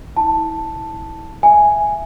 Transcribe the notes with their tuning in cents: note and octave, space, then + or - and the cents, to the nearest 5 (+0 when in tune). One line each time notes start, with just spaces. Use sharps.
E4 -30 A5 +0
E5 +10 G#5 +0